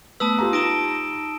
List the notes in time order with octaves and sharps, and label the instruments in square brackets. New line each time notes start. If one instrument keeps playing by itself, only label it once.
[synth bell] A3 B3 B4 [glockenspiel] A5 D#6 E6
[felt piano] F4 G4 A#5
[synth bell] D#4 A5 G7 [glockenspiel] D7 E7